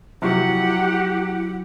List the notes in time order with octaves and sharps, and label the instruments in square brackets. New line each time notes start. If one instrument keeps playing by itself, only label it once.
[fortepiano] C3 F3 F#4 [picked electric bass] F#3 [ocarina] E4 [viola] G4 F#5